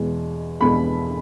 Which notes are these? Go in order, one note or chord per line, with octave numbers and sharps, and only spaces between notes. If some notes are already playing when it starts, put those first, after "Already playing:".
Already playing: E2 B2 G#3
E2 B2 G#3 B5